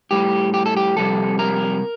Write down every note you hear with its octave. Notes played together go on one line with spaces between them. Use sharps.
A2 G3 G4
G4
A4
G4
F2 C3 G3 A4
A#4